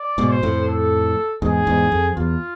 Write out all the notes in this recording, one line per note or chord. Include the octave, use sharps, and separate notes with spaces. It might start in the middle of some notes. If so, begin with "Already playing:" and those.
Already playing: D5
G#2 B2
C5
F2 A2
A4
E2 G#2 G#4
E2 G#2
F2
E2 F4